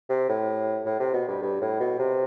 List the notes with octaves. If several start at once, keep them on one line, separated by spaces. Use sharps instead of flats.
C3
A2
A2
C3
B2
G2
G2
A2
B2
C3